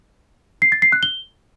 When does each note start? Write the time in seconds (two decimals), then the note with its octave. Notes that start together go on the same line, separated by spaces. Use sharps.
0.62 C7
0.72 A6
0.82 C7
0.92 F#6
1.03 G7